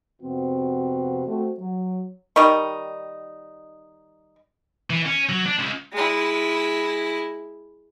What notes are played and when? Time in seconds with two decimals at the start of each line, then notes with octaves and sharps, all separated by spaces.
0.22 F2 C3 F3 B3 C4 F#4
1.26 A3 C4 F#4
1.60 F#3
2.36 D#3 G3 D#4 C#6
4.90 E3
5.06 C#4
5.29 F#3
5.46 D4
5.59 C#2
5.92 G#3 E4